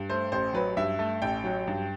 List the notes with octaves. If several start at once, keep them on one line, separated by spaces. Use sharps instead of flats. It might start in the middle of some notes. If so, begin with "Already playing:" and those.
Already playing: G2
A3 C5
A1 C5
F#3 B4
G2 E5
A3
A1 G5
F#3
G2